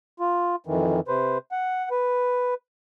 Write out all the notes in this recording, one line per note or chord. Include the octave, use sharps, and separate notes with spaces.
F4
F2 D#3 E3
C3 B4 C5
F#5
B4